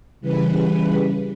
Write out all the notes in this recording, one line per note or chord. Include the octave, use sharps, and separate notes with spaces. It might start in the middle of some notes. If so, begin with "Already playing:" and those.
C#3 E3 G3 B4